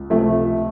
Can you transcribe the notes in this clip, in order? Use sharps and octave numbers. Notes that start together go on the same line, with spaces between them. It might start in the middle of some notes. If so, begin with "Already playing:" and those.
Already playing: C#2
C3 F3 A3